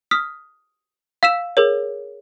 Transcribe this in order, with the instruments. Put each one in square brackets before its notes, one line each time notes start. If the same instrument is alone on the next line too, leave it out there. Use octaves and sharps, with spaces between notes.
[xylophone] D#6 F6 B6
F5 E6 B6 E7
G#4 A#4 C#5